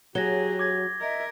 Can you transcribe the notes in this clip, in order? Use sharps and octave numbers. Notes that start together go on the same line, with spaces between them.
F#3 G4 G#4 C#5 A#6 G7
D6 G#6 A#6
A#4 D#5 E5